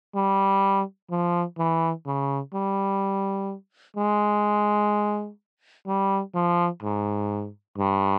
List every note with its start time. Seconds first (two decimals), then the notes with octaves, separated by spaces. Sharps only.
0.15 G3
1.10 F3
1.59 E3
2.07 C#3
2.54 G3
3.97 G#3
5.87 G3
6.35 F3
6.83 G#2
7.78 G2